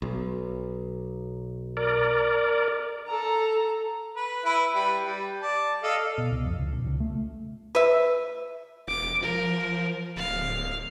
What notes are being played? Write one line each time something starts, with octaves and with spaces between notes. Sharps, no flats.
B1
A#4 D5
A4 A#5
B4
E4 B4
G3 B4
G3
D5 A5
A4 D#5 F5
B2
C2
F2
C#2
B1
C#2
A3
B4 E5
E1 D6
F3 A#4
D1 F5